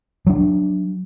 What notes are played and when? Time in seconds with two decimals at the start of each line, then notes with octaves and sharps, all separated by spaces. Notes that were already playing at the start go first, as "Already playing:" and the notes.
0.27 F#3 D4